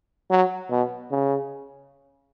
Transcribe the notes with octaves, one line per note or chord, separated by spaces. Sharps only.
F#3
B2
C#3